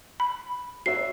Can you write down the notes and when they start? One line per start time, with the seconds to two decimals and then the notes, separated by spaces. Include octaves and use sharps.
0.20 B5
0.86 F#4 C#5 E5 C7